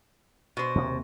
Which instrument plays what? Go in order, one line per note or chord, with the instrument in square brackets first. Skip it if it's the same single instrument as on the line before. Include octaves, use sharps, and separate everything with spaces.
[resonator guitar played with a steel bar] B2 C5
[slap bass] D#2 C3 A#3